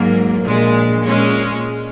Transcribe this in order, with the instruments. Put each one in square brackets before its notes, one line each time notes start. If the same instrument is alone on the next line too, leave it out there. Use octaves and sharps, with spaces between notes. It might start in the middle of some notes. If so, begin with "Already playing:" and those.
Already playing: [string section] G#2 F#3 A#3
A#1 A#2 G#3
A#2 G#3 C#4